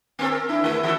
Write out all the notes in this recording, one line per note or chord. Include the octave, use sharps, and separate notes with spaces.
A#3 C4 A4
A#4
D4 E4
E2 A3 E4
E3 F#4 A4